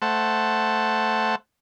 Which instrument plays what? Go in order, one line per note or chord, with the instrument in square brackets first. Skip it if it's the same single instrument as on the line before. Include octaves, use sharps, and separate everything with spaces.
[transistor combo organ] A3 C5 F#5 A5